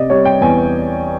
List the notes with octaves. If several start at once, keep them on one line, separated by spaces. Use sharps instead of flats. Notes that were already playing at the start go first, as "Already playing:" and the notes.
Already playing: C3 D5 D#5
G3 C#5
G5
E2 G#5